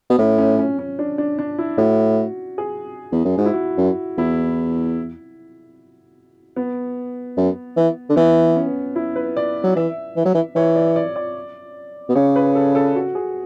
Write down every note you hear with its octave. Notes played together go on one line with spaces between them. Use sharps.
B2
A2 C#4
C#4
C#4
C#4
D4
D4
D4
E4
A2 F#4
G#4
E2
F#2
G#2 F#4
E4
F#4
F#2
E2 E4
B3
F#2
E3
D3
E3 B3
C#4
E4
B4
D5
F#3
E3 E5
E3
F#3
E3
E3 C#5
D5
D5
D5
B2
C#3 C#5
B4
A4
A4
F#4
G#4